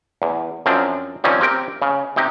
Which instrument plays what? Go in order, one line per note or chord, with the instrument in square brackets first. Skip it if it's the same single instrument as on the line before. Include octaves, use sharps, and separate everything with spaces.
[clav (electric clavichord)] E2
F#2 F3 C4 D4
D#3 F3 G3 C4 C#4
C4 G4 A#4 G5
C#3
C3 D#4 G4